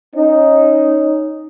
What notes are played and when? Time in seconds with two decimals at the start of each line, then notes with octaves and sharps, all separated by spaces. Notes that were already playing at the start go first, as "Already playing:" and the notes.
0.15 C#4 D#4